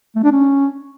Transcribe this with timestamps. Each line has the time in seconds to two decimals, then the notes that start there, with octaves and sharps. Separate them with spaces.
0.16 A3
0.24 D4
0.32 C#4